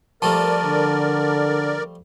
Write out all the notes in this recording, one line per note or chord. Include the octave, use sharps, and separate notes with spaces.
F3 G3 A3 A#4 D5 A5
D3